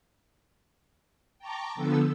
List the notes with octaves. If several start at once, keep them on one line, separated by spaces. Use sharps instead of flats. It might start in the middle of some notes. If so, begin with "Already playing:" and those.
G5 A5 A#5 C#6 D6
D3 F3 B3 A4 E6